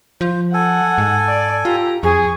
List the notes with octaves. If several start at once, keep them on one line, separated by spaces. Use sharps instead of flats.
F3 C5
A4 F#5 G#5
G#2
D5
F4 G4 A#5
F2 G#4 C#6